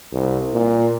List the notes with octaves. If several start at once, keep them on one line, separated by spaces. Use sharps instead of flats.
C2
A#2